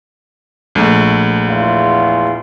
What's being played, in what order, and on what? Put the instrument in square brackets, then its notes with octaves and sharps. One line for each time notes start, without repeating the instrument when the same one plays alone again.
[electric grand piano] A#1 A3
[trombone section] E2 F4